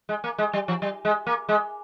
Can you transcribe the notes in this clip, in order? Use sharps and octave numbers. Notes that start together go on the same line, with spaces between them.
G#3
A#3
G#3
G3
F3
G3
G#3
A#3
G#3